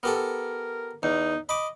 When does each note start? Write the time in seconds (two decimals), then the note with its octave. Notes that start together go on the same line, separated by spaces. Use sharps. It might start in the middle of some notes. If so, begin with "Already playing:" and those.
0.03 B3 G4 A4 A#4
0.15 A#4
1.03 E2 D#4
1.49 D#5 B5 D6